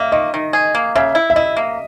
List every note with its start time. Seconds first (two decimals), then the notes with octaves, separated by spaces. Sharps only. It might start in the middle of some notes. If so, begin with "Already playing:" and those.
Already playing: A#3 D#5 E5
0.12 D#3 D#5
0.34 D#3
0.53 G#4
0.75 A#3
0.96 C#3 E5
1.15 E4
1.30 E5
1.36 E4 D#5
1.57 A#3